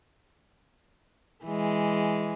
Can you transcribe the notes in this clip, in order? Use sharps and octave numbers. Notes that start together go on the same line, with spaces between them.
E3 G#3